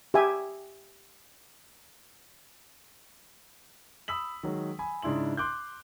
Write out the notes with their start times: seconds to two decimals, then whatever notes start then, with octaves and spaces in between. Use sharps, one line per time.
0.14 G4 E5 G#5
4.08 B5 D#6 E6 B6 F#7
4.43 D#3 F#3 G#3
4.79 G#5 B5
5.02 G#2 C#3 D4 E4 C6 F#7
5.37 C6 D6 F#6 G6